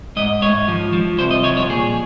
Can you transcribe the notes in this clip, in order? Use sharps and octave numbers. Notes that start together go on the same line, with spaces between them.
G#2 D#5
G#2 C#5
F3
F3
C2 C5
D#5
F3 C#5
C#5
A#2 G#4